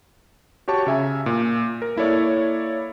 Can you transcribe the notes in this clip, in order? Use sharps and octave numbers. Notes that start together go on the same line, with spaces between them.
F#4 G4 C#5 A5 C#6
C#3 E5 G#5 A#5
A#2
A#4
A#3 E4 A4 C#5 D5